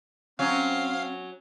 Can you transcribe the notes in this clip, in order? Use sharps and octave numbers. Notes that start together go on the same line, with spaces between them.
F#3 C4 C#4 F5